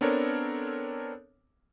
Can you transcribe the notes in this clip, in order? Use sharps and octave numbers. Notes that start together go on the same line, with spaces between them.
B3 C4 D4 A4 A#4 C#5